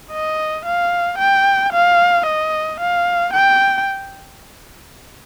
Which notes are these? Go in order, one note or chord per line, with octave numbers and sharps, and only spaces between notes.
D#5
F5
G5
F5
D#5
F5
G5